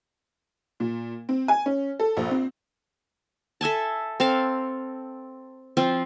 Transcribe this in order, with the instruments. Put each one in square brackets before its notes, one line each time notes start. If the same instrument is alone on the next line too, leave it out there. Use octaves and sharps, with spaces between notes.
[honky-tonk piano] A#2
C4
G#5
C#4
A4
A#1
C4
[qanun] A4 E5 G#5 A5
C4 A4 F5
F3 C4 F4